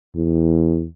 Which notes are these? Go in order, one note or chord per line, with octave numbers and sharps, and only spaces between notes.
E2